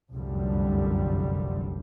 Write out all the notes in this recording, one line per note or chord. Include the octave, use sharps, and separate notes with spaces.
F1 C2 F#2 D3 F3 G3